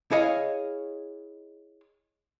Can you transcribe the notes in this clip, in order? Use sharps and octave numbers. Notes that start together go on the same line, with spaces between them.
E4 G#4 C#5 D#5 F5